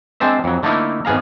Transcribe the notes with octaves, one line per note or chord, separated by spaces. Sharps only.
G#3 C4 D4 C5 E5
F2 F#3
D3 A3 A#3 D#4 E4
G#1 B3 G#4 F5 A#5